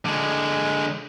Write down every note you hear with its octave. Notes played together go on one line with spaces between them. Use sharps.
D3 G#3